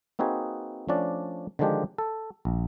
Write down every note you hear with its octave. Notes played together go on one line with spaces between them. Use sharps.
A#3 C4 D#4 F#4 G#4 B4
F3 A3 C#4 D4 D5
D3 D#3 F3 G#3 D4 G4
A4
A#1